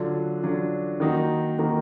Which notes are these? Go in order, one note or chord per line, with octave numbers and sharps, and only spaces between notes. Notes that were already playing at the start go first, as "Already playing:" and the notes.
Already playing: D3 F#3 D4 F4
D3 F#3 D4 F4
D#3 A#3 D#4 F#4
D#3 A#3 D#4 F#4